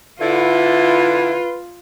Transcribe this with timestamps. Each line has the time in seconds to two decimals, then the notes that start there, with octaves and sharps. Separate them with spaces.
0.21 D3 E4 F4 B4